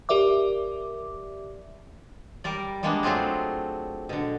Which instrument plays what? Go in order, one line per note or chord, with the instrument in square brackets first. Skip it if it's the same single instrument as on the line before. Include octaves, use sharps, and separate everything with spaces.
[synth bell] G4 A#4 D5 E5 D6
[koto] G3 A#4 D5
G3 G#3 A#3 B3 D4
F#3 A3 C4 F4 G#4
B2 D3